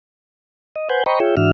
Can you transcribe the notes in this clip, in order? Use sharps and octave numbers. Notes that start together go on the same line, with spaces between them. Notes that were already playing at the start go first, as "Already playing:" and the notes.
D#5
B4 C5 F#5 G#5 G6
C5 D#5 G5 A#5 B5 C#6
F4 G#4 C#5 E5 G5
G#2 E3 D4 F#4 E5 F6